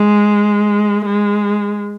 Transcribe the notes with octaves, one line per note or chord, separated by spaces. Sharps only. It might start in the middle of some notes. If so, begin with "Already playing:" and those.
Already playing: G#3
G#3